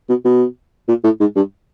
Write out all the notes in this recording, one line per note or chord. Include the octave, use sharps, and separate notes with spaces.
B2
B2
A#2
A2
G#2
G2